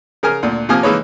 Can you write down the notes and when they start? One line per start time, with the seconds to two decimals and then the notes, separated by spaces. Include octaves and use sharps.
0.23 C#3 A#4 G#5 F6
0.43 D2 A#2
0.69 C3 F3 A#3 G#5 D#6 F6
0.83 E3 G#3 A#3 D#4 B4 C#5